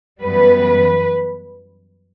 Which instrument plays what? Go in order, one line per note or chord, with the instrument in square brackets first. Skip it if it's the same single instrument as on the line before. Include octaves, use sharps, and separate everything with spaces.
[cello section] F#2 E3 G3 B3 B4